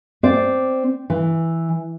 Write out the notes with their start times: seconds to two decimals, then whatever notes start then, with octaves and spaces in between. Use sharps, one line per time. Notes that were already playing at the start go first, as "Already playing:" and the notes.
0.23 C4 D5
1.10 E3